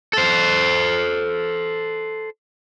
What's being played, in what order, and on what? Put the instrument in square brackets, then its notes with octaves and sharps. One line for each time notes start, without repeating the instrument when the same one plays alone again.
[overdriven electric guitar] A4 C5